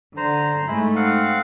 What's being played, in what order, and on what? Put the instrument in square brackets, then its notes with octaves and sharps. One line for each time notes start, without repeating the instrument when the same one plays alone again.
[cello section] D3 [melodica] C5 A#5
[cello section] G#2 A3 D#4 [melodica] G#3 E4 B5
[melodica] C4 F5 F#5